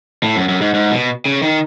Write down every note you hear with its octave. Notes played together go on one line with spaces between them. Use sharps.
A2
F#2
F#2
G#2
G#2
B2
C#3
D#3